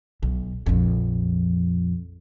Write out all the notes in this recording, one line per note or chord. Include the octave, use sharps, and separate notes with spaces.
B1
A#1 F2